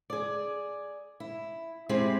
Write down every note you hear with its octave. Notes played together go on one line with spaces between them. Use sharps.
G#4 D5
E4
G#3 C4 E4 G4 G#4